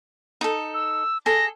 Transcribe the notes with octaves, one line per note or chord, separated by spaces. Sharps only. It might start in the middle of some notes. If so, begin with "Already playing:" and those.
D#4 A4
E6
G#4 A4 A#6